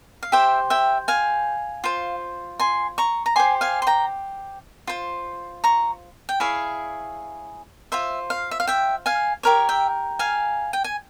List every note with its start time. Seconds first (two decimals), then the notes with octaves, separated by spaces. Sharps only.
0.23 F5
0.32 G4 C5 E5 G5
0.70 E5 G5
1.08 F5 G#5
1.84 F4 C5
2.60 G#5 C6
2.98 A#5 C#6
3.26 A#5
3.36 G4 C5 G#5 C6
3.61 F5 G#5
3.82 C6
3.87 G5 A#5
4.87 F4 C5
5.64 A#5 C#6
6.29 G5
6.40 E4 G#4 C#5 F5
7.92 F4 C5 E5
8.30 F5
8.51 E5
8.60 F5
8.67 E5 G5
9.06 F5 G#5
9.43 G4 A#4 C#5
9.69 E5 G5
10.19 F5 G#5
10.73 G5
10.84 G#5